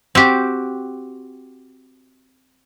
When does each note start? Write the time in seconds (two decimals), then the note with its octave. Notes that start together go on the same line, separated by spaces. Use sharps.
0.15 C4 F#4 G4